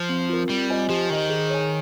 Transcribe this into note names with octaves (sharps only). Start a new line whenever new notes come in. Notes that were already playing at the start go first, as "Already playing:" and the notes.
Already playing: F3
C4
F4 A#4
G3 C4
F4 C5 D#5 G#5
F3 G4
D#3 C5 D#5
G#4
C#5 G#5